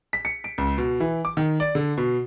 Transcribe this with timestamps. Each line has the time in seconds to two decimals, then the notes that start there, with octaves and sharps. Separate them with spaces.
0.13 B6
0.25 C#7
0.44 D7
0.58 C#2
0.78 B2
1.00 E3
1.25 D6
1.37 D#3
1.60 D5
1.75 D3
1.98 B2